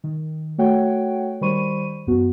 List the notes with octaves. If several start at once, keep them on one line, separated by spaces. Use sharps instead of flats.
D#3
A3 F#4 C#5 F#5 G5
D#3 G3 C5 B5 C#6 D#7
F#2 B3 F#4